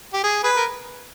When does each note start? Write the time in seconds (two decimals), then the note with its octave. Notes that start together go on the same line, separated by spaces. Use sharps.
0.14 G4
0.24 G#4
0.44 G#4 B4
0.56 A#4